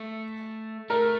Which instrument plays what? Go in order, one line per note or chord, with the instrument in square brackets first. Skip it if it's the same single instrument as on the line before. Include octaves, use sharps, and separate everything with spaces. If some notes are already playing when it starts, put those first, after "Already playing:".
Already playing: [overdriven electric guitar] A3
[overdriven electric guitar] A3 [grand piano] A#4